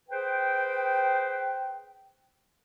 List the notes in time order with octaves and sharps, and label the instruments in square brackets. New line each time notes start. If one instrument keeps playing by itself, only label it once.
[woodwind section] G#4 B4 C5 G5